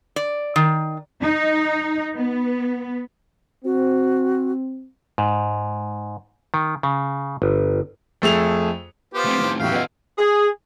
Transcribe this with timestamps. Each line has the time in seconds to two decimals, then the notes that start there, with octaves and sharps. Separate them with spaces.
0.16 D5
0.56 D#3
1.22 D#4
2.14 B3
3.65 C4 F#4
5.18 G#2
6.54 D#3
6.83 C#3
7.42 G1
8.22 F2 A3 G#4 F7
9.14 B3 F4 G4 C5
9.25 A3 C4
9.39 A2 D#3
9.59 E2 A2 C#3 F#3 G4 F5
9.71 D#3 B3 F4 D#5 F#5
10.19 G#4